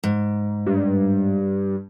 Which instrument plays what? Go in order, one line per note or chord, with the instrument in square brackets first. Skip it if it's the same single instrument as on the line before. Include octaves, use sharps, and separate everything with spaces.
[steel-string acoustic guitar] G#2
[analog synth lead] G2